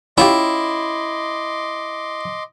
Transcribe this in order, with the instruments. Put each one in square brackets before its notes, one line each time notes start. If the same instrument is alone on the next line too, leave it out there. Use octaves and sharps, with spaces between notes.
[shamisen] C#4 F4 G4 [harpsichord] E4 [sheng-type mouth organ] D#5 C6 D6